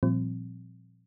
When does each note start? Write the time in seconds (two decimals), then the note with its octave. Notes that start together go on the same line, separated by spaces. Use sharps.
0.03 A#2 F3 G3 C4